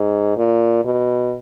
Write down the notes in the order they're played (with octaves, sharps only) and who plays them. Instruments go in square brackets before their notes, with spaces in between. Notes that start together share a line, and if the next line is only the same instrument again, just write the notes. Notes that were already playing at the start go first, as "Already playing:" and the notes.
Already playing: [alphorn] G#2
A#2
B2